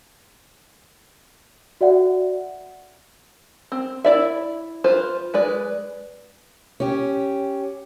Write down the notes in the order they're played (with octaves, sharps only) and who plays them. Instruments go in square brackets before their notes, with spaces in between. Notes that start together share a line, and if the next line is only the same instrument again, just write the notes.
[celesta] F#4 D5 E5 F#5
[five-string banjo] C4
E4 D5 E5
F4 B4 C5
G#3 B4 D5
[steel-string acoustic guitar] C#4 G4